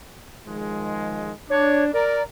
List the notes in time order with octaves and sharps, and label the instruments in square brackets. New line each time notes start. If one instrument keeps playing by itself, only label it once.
[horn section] D#3 F3 G#3
[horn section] D4 [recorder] C#5
[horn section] A#4 [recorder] D5